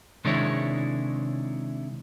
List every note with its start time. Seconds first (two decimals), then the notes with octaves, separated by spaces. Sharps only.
0.25 C3 D#3 G#3 D4 E4 C#5